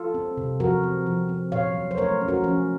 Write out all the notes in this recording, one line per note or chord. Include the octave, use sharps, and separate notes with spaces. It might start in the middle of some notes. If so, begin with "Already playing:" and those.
Already playing: F4 A4
C4
C3
F3 F#4 A#4
C4
F3
C4
A#2 C#5 F5
F#3
C5
A3 A#4 C#5
C#4
F#4 A#4
F3 C#4